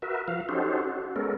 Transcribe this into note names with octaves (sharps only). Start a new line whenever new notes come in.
F#4 A#4 B4 E5
F3 F5
C#4 D#4 F#4 G4 A4 C5
F#4
G#3 B3 C#4 A4 A#4